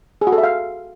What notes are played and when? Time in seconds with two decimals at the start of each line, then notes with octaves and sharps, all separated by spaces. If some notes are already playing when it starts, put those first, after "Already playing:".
0.21 G#4
0.27 F#4
0.32 A4
0.38 E5
0.43 F5